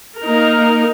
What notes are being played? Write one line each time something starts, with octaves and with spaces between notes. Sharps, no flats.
A#3 D#4 A#4